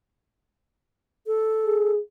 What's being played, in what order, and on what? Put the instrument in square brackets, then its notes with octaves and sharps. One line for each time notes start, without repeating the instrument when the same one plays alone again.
[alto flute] A4
[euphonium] G#4